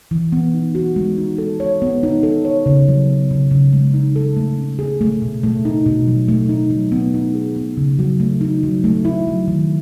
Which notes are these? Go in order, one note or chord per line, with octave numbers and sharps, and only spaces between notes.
E3
B3
D#4
F#4
G#3
D#4
A4
C#5
B3
D#4
A4
C#5
C#3
F#3
B3
C#3
C#3
G#3
D#4
A4
A3
C#4
G#4
A3
B2
A3
D#4
B2
F#3
A3
D#4
F#3
B3
D#4
G#4
B3
C#3
F#3
A3
D#4
F#3
A3
E4
F#3
D#3